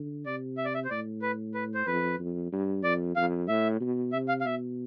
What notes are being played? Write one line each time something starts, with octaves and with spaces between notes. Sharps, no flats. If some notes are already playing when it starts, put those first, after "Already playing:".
Already playing: D3
C3 D5
E5
D5
E5
C5
A2 D5
B4
B4
C5
F2 B4
F2
G2
F2 D5
F2 F5
A2 E5
B2
C3 E5
F5
F5
B2 E5